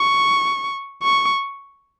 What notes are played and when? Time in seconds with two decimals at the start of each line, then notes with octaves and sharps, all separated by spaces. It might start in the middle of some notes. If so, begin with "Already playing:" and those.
Already playing: C#6
1.03 C#6